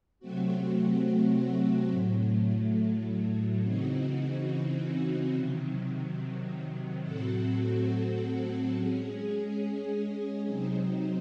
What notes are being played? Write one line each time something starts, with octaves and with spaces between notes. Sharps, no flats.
C3 F#3 A3 C4 F#4
A2 F#3 A3
C#3 E3 C4 D#4 F#4
C3 D#3 F#3
A2 F#3 C4 F#4 A4
G#3 C#4 G#4
C3 F#3 C4 D#4